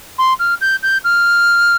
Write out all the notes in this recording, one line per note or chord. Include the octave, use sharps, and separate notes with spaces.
C6
F6
G6
G6
F6